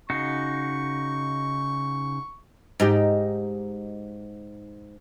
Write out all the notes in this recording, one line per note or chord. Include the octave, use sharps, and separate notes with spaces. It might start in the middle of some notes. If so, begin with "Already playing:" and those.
C#3 D#4 F#4 C#6
G#2 D#4 G4